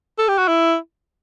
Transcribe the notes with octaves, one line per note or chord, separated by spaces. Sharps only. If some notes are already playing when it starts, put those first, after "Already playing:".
A4
G4
F#4
E4